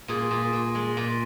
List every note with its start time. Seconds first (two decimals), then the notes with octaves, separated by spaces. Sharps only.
0.08 A#2 G#4
0.31 A#2
0.53 A#2
0.75 G#3
0.97 A#2